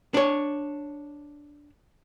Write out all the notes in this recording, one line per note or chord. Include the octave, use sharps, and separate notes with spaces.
D4 C#5